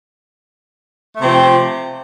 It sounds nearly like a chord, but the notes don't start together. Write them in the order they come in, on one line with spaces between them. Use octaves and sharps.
A3 C3 C4 F3